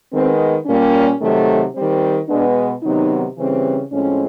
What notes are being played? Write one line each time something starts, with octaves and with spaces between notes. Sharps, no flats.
D#3 G#3 B3 C4
A#2 G3 A#3 C#4
C3 D#3 F#3 A3
D#3 G3 C4
B2 G#3 B3 D4
C3 D#3 F#3 B3 D#4
C#3 E3 G3 C4
A2 F3 G#3 C4 C#4